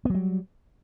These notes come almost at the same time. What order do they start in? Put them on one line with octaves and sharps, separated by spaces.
B3 F#3 G3